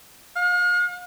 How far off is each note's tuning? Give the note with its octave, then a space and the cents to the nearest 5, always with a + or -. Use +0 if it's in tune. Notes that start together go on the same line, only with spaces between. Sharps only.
F5 +40